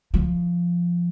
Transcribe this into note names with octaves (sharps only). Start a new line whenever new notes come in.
F3